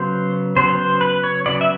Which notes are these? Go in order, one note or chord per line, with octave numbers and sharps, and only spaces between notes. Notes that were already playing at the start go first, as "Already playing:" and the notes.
Already playing: C#3 F#3 B3 C5
C#3 F#3 B3 C5
C5
B4
C#5
C#3 F#3 B3 D5
E5